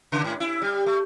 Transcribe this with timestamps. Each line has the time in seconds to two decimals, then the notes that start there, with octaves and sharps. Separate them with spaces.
0.12 C#3
0.24 G#2
0.40 E4
0.62 G3
0.86 A3